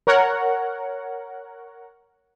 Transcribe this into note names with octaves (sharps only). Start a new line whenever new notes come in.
A#4 C#5 F#5